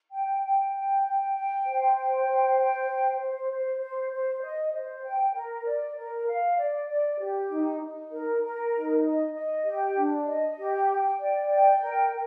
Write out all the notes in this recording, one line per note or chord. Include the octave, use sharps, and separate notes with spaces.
G5
G5
G5
G5
G5
C5
G5
C5
G5
C5
C5
C5
C5
C5
D#5
C5
G5
A#4
D5
A#4
F5
D5
D5
G4
D#4
D#4
A#4
A#4
D#4
D#5
D#5
G4
D4
D#5
G4
G5
D5
G5
A#4
A#4